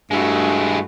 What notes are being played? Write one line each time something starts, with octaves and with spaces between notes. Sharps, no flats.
G2 G#3 A3 E4 F#4